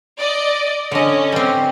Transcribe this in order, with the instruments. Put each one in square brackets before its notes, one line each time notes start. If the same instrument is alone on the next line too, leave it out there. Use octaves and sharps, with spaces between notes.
[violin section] D5 D#5
[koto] D3 D#5 [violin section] C#4
[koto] G3 C4